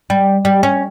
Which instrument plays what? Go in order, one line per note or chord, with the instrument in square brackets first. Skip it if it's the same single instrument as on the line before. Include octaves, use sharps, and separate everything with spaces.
[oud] G3
G3
C#4